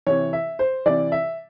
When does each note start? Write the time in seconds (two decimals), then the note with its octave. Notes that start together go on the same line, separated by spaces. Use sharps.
0.07 C3 E3 C#5
0.33 E5
0.59 C5
0.86 C3 E3 D5
1.12 E5